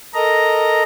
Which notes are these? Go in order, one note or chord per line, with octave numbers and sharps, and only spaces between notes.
A4 A#4 D#5 A#5